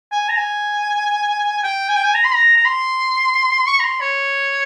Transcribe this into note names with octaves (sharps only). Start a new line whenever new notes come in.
G#5
A#5
G#5
G5
G#5
G5
G#5
A#5
C6
A#5
A#5
C6
C#6
A#5
C6
C#5